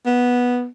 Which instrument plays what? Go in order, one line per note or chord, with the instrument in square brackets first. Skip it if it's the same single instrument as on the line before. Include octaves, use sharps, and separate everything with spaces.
[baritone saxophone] B3